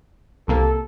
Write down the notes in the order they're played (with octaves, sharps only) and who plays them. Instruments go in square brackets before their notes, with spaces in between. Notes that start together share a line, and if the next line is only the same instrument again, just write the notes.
[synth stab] C2 C3 A#3 [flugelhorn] A4